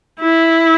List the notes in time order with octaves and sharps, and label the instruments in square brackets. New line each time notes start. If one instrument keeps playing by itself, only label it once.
[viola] E4